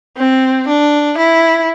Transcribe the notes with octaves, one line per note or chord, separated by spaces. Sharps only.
C4
D4
E4